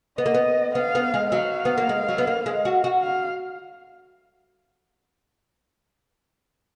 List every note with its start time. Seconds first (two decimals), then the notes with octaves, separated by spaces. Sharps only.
0.18 B3 D#5
0.26 A#3
0.34 B3
0.75 B3 F5
0.95 B3
1.14 G#3
1.32 F#3 F5
1.65 B3
1.78 A#3
1.89 G#3
2.08 F#3
2.18 B3
2.27 A#3
2.46 G#3
2.65 F#4
2.84 F#4
3.03 F5